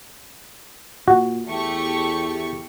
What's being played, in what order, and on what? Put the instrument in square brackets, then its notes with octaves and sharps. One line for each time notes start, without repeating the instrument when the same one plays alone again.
[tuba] A#2 [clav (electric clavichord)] F#4
[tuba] E2 [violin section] A3 G4 C#6